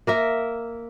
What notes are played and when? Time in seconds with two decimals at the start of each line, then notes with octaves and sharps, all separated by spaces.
0.07 A#3 A#4 E5